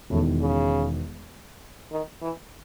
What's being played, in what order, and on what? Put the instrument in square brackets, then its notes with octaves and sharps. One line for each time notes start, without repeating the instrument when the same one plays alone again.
[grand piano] E1 E2 D#3 [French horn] A2
[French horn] C#3
D#3
E3